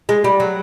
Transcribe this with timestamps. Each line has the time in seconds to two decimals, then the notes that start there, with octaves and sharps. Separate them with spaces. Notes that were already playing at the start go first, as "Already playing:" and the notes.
0.09 G#3
0.24 G3
0.40 F#3